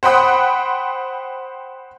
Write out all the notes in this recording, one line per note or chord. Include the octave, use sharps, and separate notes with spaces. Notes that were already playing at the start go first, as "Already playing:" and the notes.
C5 F#5 G5 B5 D#6 F#6